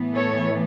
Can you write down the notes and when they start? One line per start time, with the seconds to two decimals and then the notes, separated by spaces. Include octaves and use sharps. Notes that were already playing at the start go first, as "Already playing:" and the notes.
Already playing: A2 E3 B3
0.15 A4 C#5